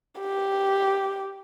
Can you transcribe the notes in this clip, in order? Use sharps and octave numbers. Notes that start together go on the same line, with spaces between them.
G4